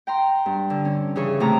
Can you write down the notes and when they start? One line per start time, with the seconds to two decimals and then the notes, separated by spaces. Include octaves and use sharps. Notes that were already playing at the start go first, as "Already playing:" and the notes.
0.07 G5 A#5 C6
0.46 G2
0.70 D3
0.85 C#4
1.16 C#3 E3 G#4 C#6
1.40 A2 C3 A3 A#5